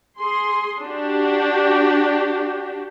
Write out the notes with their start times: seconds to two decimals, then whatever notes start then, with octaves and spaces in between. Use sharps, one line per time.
0.19 G#4 C6
0.83 D4 F#4 G4